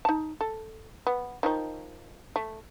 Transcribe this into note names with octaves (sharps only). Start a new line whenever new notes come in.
D#4 A5
A4
B3
D#3 F3 D#4
A3